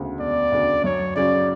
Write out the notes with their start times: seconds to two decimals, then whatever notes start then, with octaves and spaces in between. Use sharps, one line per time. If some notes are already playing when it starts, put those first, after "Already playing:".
Already playing: E1 D2 C#3
0.20 E1 D5
0.52 D2 C#3
0.84 F#2 C#5
1.16 C#3 F#3 C#4 D5